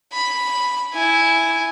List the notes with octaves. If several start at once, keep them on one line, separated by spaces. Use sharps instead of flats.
B5
E4 G#5